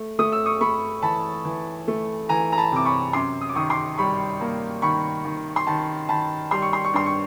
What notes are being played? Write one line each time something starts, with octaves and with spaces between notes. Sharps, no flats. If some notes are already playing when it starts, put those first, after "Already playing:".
Already playing: A3
A3 D#6
E6
C#6 D#6
A3 B5 C#6
E3 A5 B5
E3
A3
E3 G#5 A#5
A#5
A5 B5
C3 D6
B5 C#6
F#2 C6 D6
D#6
D6
D#3 C#6 D#6
C6 D6
G3 B5 C#6
A#3
D#3 B5 C#6
D#3
C6
D#3 A5 B5
D#3 A5 B5
G3 C6
C#6
C6
C#6
G2 C6
C#6